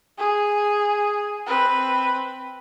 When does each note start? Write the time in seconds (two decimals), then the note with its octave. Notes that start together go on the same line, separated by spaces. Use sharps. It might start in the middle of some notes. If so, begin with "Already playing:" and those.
0.18 G#4
1.47 C4 B4